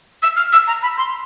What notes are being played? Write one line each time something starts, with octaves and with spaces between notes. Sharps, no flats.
E6
F6
E6
A#5
B5
C6